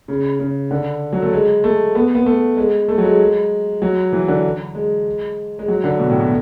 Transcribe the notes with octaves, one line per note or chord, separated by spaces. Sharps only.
C#3
C#3
D3
F#3
A3
G#3
A3
B3
B3
A3
G#3
A3
F#3
G#3
F#3
E3
D3
G#3
G#3
F#3
D3
B2
A2
B2